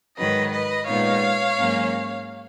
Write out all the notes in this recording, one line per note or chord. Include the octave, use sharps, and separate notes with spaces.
G#2 D#3 F#3 B4 D#5
B4 D#5
A#2 G#3 B3 D#4 C#5 F5
G#2 F#3 A#3 C#4